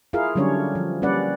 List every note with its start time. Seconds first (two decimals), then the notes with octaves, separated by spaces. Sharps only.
0.13 E4 F4 G#4 A#4 F5
0.35 D3 F#3 G3 C#4 D4 C#5
0.75 F3
1.02 G3 A#3 C#4 B4 D5 F#5